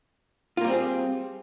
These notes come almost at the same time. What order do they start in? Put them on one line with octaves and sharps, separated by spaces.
F4 A#3 G3 C4 G#4